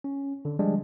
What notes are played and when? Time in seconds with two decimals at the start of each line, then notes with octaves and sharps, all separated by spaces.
0.04 C#4
0.45 D3
0.59 F3 G3 G#3 D4